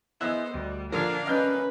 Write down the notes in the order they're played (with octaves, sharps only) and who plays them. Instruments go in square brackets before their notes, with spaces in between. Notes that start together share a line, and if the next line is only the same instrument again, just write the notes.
[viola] B3 C5 [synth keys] E4 G#4 [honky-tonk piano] D#5 E6 F#6
[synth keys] D2 [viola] G3
[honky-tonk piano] A#2 D3 F3 [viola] D4 F5 [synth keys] A#4
[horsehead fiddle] C#4 B4 [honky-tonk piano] D#5 F6 G6